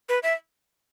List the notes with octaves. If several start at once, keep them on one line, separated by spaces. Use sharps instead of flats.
B4
E5